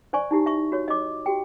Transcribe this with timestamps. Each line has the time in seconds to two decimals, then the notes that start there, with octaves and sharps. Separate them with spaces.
0.13 C5 D5 G#5 C#6
0.31 D#4 E4 G4
0.46 E5 C#6
0.72 F#4 C#5
0.88 D#5 D6
1.26 F#4 G4 G5